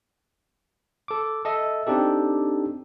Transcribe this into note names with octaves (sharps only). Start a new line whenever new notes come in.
A4 D6
A4 D#5 E5
C4 D4 D#4 G4 A4